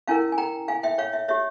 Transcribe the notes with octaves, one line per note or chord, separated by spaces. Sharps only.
C#4 E4 A#4 F5 G#5
G#5
G5 A#5
F5 G#5
E5 G5
C#5 F5
E5
G4 C#5 E5